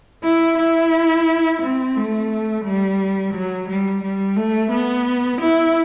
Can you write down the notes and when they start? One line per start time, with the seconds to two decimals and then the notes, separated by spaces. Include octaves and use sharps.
0.23 E4
0.57 E4
1.62 C4
1.96 A3
2.65 G3
3.33 F#3
3.68 G3
4.03 G3
4.36 A3
4.71 B3
5.41 E4